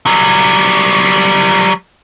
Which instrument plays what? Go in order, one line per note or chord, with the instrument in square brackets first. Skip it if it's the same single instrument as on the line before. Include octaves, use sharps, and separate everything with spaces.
[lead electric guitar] F#3 G3